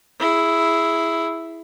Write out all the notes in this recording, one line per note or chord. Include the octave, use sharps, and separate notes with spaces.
E4 G#4